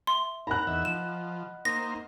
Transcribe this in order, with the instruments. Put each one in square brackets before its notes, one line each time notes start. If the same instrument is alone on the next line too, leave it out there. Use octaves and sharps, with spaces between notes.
[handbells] E5 [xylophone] C6
[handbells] D#4 A#4 F#5 [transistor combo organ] A#5 [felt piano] B5 F#6
[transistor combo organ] E2 E5 [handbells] D#5 F#5
[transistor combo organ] F3 [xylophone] E7
[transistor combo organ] A#3 D#4 C5 [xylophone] A#6